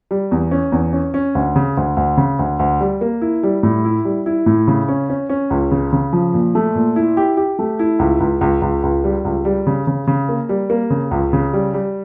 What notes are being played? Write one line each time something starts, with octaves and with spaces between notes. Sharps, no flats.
G3
E2
C#4
E2
C#4
C#4
D2
C#3
D2
D2
C#3
D2
D2
G3
A#3
E4
G3
A2
E4
G3
E4
A2
C#3
C#4
C#4
C#4
C#2
C#3
C#3
F3
A#2
A3
A#2
E4
G4
G4
A3
E4
C#2
C#2
C#2
C#2
C#2
G3
C#2
G3
C#3
C#3
C#3
A#3
G3
A#3
C#3
C#2
C#3
G3
G3